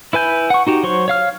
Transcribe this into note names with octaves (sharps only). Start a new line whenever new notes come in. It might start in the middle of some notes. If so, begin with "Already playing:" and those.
E4 B4 G#5 G6
F#5 C#6
D#4 F#4 G4
F#3 C5 C#6
C#5 F5 F6